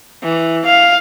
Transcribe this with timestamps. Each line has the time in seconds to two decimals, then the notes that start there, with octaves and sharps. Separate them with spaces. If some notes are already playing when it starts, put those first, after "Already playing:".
0.23 E3
0.65 F5